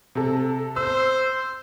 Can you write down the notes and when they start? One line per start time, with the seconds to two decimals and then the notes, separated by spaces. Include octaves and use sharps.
0.15 C3 A4
0.76 C5 E6